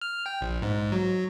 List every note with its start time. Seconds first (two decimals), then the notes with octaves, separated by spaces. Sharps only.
0.01 F6
0.26 G5
0.41 A#1
0.62 G#2
0.92 F#3